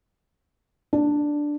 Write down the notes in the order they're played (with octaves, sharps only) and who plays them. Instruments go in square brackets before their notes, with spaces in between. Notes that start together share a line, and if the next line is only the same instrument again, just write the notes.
[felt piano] D4